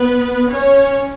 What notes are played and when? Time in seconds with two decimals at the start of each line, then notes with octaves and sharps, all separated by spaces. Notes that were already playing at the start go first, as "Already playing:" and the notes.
Already playing: B3 B4
0.50 C#4 C#5